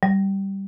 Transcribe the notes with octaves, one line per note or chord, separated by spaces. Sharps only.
G3